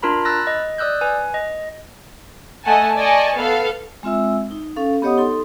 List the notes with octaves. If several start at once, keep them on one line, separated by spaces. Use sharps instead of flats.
D4 F4 A#4 A#5 B5
B5 E6 F#6 A6 A#6
D#5
D5 D#6 E6 F#6 G6
B4 G#5
D#5
A3 D#5 F#5 G#5 A5
D5 D#5 G#5 A5 C#6
B3 A4 F5
G#3 C4 F4 E5 E6
D#4
C#4 A4 F5
B3 G4 C#5 D#5 F#5 D#6
D#4 A4 C6